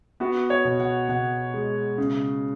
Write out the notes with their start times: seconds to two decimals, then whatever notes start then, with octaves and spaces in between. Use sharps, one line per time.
0.20 B3 F#4
0.50 C#5
0.65 B2
0.79 F#5
1.09 B2 F#5
1.54 G#3
1.98 C#3